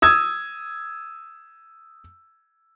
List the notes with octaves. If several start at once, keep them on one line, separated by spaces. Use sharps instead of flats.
D#6 E6 G#6